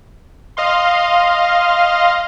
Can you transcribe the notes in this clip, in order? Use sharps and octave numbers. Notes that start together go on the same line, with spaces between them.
D#5 F5 C6